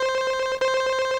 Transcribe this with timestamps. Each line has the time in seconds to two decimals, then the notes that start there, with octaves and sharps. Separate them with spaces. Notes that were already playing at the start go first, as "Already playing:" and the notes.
Already playing: C5
0.62 C5